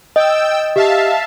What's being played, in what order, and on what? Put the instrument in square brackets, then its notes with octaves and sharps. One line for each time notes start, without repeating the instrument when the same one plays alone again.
[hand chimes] D#5 [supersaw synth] G5 E6
[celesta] G4 [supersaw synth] E5 F5 A5